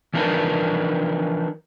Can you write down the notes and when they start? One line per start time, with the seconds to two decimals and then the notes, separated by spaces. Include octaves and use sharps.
0.14 E3 F3 D4 D#4 A#4 B4